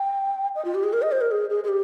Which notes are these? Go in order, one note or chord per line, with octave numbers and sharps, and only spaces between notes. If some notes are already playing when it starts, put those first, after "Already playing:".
Already playing: G5
D#5
F4
G4
G#4
A#4
D#5
C5
A#4
G#4
G#4
G#4
G4